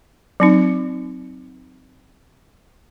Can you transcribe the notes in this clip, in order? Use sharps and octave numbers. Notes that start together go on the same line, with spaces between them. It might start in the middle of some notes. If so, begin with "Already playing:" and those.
F#3 C4 D#4